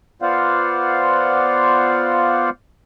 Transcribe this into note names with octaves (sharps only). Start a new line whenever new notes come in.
B3 F4 C5 D5 F5 F#5